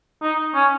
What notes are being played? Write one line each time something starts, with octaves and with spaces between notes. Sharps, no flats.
D#4
C#4